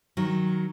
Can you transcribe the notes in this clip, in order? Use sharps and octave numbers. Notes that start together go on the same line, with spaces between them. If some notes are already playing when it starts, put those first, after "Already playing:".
D#3 F#3